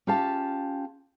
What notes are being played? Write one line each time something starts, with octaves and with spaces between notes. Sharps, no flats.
C#4 F4 G4 F5 A5